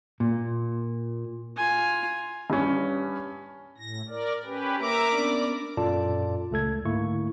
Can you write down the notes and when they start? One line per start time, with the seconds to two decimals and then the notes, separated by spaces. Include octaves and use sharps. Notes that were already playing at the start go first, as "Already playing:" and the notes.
0.20 A#2
1.56 F4 G#5
2.50 G2 C#4
3.78 A2 A#6
4.09 A#4 D5
4.45 C#4 G4 B4
4.80 A#3 A#4 E5 A#5 D6
5.11 B3 C#4 D4 D5
5.77 F#2 A#2 F4 A4 D5 A5
6.51 C#2 A3 A4 G#6
6.85 G#2 D3 A3 A#3 E4 C#6